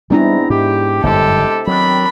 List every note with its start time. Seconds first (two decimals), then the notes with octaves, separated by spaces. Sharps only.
0.10 G#2 G3 B3 C4 D4 E4 A#5
0.50 G#2 G4
1.03 G1 F#2 A2 C3 G#3 G4 A4
1.67 D#3 F#3 C4 D4 B5